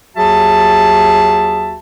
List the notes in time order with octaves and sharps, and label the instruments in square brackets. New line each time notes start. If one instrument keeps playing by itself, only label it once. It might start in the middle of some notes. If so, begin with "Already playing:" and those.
[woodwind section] D#2 F#3 F#4 G#4 E5 A5